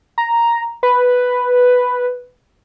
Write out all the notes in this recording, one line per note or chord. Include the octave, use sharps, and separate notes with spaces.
A#5
B4